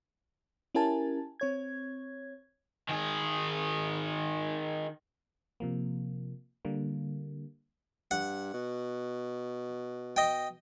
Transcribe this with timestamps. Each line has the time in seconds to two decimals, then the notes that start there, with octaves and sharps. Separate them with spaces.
0.75 C#4 E4 G4 A#4 G#5 A5
1.40 C4 C#5 G#6
2.89 D#3 G#4
5.60 C3 F3 A#3
6.65 D3 G3 A#3
8.11 G2 F#5
8.54 B2
10.16 D#5 G5